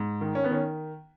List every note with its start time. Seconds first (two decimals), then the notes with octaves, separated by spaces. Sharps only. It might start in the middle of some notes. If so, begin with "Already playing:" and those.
Already playing: G#2
0.21 D#3
0.35 C#4
0.44 B3
0.51 D#3 C#4